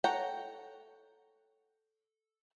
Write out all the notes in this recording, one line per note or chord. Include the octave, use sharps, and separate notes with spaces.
A4 C#5 F#5 G5 A#5